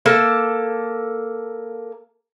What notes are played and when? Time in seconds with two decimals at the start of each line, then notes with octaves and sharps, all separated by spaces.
0.06 A#3 A4 A5